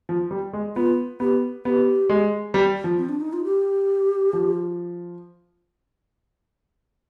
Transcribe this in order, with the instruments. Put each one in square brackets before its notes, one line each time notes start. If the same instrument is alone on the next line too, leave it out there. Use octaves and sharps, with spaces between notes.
[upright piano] F3
G3
G#3
[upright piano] B3 [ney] F4
[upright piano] B3 [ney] G4
[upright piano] B3 [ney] G4
[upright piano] G#3
G3
F3
[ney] C4
D4
D#4
F4
G4
[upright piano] F3